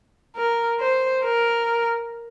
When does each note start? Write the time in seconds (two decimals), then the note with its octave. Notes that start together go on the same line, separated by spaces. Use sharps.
0.36 A#4
0.80 C5
1.24 A#4